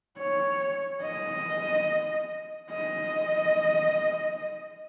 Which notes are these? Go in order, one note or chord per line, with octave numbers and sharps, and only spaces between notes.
C#5
D#5
D#5